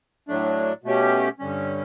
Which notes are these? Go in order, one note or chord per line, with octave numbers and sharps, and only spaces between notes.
A2 F#3 A3 D4
B2 A3 C#4 G4
G2 D3 G3 C#4